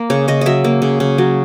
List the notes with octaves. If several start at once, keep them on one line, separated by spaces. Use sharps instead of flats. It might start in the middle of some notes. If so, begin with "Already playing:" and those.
Already playing: A#3
C#3 C#5
C#3 D#5
F#3 D#5 E5
A#3
C#3
C#3
F#3